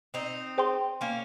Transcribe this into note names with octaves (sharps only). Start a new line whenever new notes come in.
C4 D#4
G#4 C5 G5 C6
A#3 C#4